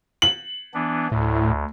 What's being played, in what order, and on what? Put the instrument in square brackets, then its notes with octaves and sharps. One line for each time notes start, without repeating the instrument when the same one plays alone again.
[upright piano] F#7
[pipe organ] E3 B3 D4
[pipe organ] D2 [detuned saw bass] A2